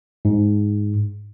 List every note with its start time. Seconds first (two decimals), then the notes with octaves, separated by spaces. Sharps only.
0.25 G#2